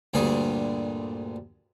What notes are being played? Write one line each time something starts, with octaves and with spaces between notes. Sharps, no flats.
D2 G2 A#2 D3 G#4